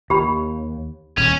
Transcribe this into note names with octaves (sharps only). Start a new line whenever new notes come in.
D#2 G4 B5
D#1 C#4